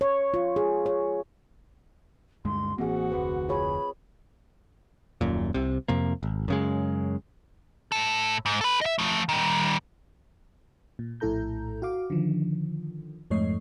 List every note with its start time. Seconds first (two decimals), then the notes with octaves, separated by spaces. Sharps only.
0.01 C#5
0.34 F4
0.56 G#4
0.86 C#5
2.45 D2 G2 G#3 C6
2.78 A1 E3 A#3 C4 F#4 G#4 F#5
3.12 F1 D2 B4
3.49 F4 G#4 C#5 B5
5.21 D#1 F#2 A#2
5.54 C2 C3
5.88 F2 C3 A#3
6.23 G#1
6.48 F#2 C#3 G#3
7.92 A2 A4
8.46 G#2
8.61 A4 B4
8.81 D#5 E5
8.99 F3 A3
9.29 D#3 G3
10.99 A#2
11.20 A#1 A2 E4 A4 A#5 G6
11.82 F#4 F5 D6
12.10 D3 D#3 F3
13.30 F2 G#2 A3 C#5 D#5 C7